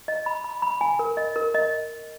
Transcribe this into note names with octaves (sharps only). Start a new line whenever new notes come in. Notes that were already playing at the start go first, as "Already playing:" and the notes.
D#5
B5
B5
B5
G#5
A#4
D#5
A#4
D#5